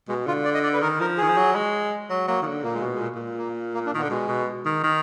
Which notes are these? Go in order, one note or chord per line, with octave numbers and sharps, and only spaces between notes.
B2 G#3
D3 F4
D5
D#5
D5
B4
D#3 A#4
F3 A#4
D#3 G#4
F3
F#3
G#3
F#3
F#3 A#3
D#3
D3
A#2 A#3
G#3
B2
G#3
A#2
A#2
A#3
A#3
D4
D#3
B3
D3
B2 G#3
B2
D#3
D#3